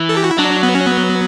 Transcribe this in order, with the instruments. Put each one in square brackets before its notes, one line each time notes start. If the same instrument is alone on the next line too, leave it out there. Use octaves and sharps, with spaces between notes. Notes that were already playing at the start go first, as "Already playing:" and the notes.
Already playing: [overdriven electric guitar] E3
[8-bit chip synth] A4
G4
F#4
E4
[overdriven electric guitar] F#3 [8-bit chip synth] D4
[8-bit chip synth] B3
C#4
B3